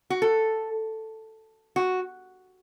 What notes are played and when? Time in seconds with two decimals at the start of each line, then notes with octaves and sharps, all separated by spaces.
0.10 F#4
0.22 A4
1.76 F#4